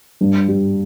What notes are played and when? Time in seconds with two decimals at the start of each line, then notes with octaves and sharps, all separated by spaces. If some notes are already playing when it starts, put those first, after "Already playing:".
0.21 G2
0.48 G3